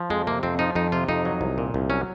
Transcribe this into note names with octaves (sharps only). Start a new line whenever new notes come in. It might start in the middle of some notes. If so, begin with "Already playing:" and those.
Already playing: F3
F2 G#3
C3 A#3
F2 C4
F3 D#4
F2 D#4
C3 F4
F2 D#4
F#3
C2
A#2
C2
F#3 C#4